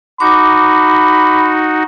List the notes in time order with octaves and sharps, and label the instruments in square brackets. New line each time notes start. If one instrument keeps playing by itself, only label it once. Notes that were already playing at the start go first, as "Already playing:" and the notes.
[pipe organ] D#4 F#4 [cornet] B5 [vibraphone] D6